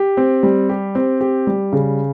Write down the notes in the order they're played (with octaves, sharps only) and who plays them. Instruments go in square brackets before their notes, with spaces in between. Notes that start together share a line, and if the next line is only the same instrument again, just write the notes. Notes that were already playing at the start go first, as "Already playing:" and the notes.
Already playing: [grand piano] G4
C4
G3
G4
C4
G4
G3
C#3